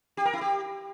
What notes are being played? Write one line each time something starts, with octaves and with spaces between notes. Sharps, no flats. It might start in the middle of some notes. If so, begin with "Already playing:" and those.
G4
A#4
E4
G4